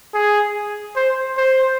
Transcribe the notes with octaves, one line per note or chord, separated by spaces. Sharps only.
G#4
C5
C5